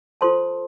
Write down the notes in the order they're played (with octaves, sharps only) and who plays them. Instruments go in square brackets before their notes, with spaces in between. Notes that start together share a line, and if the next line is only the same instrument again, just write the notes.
[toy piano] F4 A4 C5 A5 C6